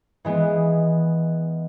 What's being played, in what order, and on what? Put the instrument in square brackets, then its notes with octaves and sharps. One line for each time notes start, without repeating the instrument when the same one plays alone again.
[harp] E3 G#3 B3